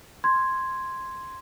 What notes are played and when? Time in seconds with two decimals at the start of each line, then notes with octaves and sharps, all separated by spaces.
0.24 C6 G#6